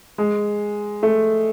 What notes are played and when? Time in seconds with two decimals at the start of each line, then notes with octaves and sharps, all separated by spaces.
0.18 G#3
1.03 A3